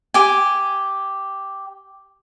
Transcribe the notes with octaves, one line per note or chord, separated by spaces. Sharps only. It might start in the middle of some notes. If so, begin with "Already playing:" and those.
G4 G#5